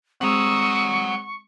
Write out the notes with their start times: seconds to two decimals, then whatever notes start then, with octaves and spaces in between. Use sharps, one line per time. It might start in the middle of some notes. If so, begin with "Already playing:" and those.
0.21 G#3 C4 F#5 A#5 C#6 D#6 E6